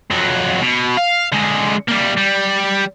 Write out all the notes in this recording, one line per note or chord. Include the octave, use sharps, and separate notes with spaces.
F2 F#3
B2
F5
D3 G#3
G3 A#3
G3